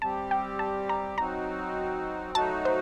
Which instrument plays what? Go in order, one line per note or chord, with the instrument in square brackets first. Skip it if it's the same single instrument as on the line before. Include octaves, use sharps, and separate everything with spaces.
[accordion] G3 C4 G4 [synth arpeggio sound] A5
[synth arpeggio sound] G5
A5
A#5
[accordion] F#3 C4 D#4 F#4 [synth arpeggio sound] A#5
[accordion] F#3 A3 D#4 F#4 [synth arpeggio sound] A5
[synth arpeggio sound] C5